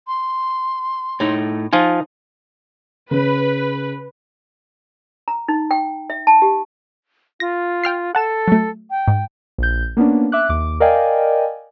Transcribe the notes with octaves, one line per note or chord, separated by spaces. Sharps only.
C6
A2 A3 D#4
F3 D#4 F4 G#5
C#3 B4
A#5
D#4
G5
E5
A5
G4
F4 A#6
G5 F6 C7
A4 F#5 A5 E7
F#3 A3
G5
G#2
A#1 G6
A#3 B3 C#4 D4
E5 D6 F#6
D#2 D6
A#4 D5 D#5 F5 G5 G#5